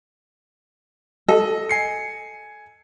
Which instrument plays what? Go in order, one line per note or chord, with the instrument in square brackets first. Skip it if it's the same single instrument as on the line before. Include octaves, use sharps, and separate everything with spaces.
[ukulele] A4 [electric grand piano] D#5
[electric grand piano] G#5 C7 C#7